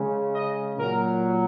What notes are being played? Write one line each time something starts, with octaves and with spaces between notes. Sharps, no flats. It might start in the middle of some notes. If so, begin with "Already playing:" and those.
Already playing: C#3 G#3
D#5
A#2 F#3 A#4